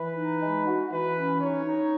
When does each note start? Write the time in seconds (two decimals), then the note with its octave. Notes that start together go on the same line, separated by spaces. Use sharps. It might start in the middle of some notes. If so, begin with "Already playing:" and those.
Already playing: E3 B4
0.17 D#4
0.41 G#3
0.66 F#4
0.91 E3 B4
1.15 C#4
1.40 D#4 C#5
1.65 D#4